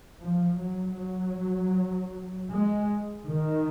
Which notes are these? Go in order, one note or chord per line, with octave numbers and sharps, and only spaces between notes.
F3
F#3
F#3
G#3
D#3